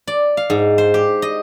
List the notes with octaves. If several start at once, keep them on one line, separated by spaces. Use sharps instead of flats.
D5
F5
G#2
C5
G4
D#5